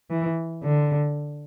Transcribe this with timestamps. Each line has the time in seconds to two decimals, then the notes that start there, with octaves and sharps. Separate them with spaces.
0.10 E3
0.63 D3